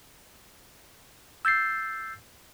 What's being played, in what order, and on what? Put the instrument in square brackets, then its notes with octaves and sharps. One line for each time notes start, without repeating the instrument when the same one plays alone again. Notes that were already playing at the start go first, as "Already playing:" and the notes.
[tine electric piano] E6 G6 A6 C7